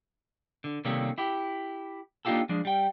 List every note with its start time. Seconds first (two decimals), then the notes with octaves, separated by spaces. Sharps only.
0.64 D3
0.85 C3 D#3 G3 A3 A#3 C#4
1.18 E4 G4
2.25 A#3 D4 D#4 F4 G4 A4
2.49 F3 G#3 D4
2.65 G3 G5